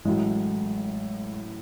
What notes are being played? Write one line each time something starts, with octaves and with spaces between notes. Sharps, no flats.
A1 A2 F#3 G#3